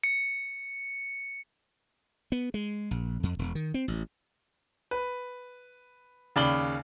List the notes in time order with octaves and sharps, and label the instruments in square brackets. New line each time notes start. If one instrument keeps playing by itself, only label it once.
[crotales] C#7
[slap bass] B3
G#3
A#1
F2
E1
D#3
C4
A1
[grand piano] B4
D#2 C#3 D5 B5 F#7 G7